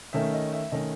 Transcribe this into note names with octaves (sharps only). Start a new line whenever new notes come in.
D#3 A3 C#4 E5
D#5
E5
D#3 A3 C#4 D#5